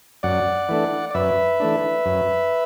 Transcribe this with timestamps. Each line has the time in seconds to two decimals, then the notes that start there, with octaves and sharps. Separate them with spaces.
0.23 F#2 D5 F#5
0.69 E3 A3 D4
1.11 D5
1.14 F#2 B4 E5
1.60 E3 A3 D4
2.06 F#2